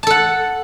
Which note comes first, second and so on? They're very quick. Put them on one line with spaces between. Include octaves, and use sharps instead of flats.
A5 A4 F#5